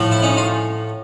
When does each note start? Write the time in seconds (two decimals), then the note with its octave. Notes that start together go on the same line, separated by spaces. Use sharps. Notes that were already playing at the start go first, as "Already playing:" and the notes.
Already playing: A2 F3 A3
0.11 E4
0.22 C#4 D#4
0.37 F4